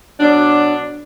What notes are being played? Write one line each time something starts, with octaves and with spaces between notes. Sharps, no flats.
B2 F#3 D4